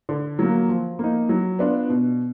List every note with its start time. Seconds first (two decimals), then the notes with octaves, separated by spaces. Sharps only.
0.09 D3
0.39 F#3 A#3
0.69 F3
0.99 A#3 D#4
1.29 F#3
1.59 B3 D4 F4
1.89 B2